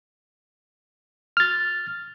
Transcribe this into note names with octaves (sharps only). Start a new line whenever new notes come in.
F6 A6